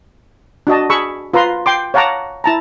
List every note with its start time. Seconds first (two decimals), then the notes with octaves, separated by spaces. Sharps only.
0.67 D4 F#4 D#5 A5
0.90 G#4 B5 C#6 E6
1.34 F4 B4 A#5 C6
1.66 G5 C6 D6
1.94 C#5 F5 F#5 A5 A#5 D6
2.44 E4 A5 A#5